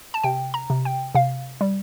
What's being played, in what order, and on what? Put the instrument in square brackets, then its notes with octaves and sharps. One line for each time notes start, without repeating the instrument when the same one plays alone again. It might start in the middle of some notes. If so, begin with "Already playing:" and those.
[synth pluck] A5
C3 G5
A#5
C3
G5
C3 F5
G3